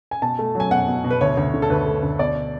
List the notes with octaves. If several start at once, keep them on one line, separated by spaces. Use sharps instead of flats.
G#5
B2 A5
A3
F#3
G#5
B2 F#5
B2
B2
B4
D2 C#5
D2
D3
A4
D2 B4
A3
D2
B2 D5